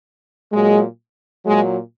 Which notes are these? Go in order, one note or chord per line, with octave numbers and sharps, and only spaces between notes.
A#2 F#3 G#3
A#2 F#3 G#3